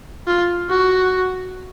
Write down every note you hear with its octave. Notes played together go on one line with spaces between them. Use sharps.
F4
F#4